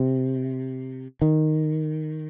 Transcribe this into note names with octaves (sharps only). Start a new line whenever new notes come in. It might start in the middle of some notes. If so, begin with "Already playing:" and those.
Already playing: C3
D#3